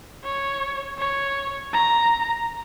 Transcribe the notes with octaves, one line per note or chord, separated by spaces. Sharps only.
C#5
C#5
A#5